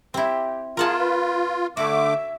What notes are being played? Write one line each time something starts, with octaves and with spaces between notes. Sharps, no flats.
C4 E4 G4
F4 G#4 A#4 F#5 A5
B4
D3 A3 F#4 E5 D6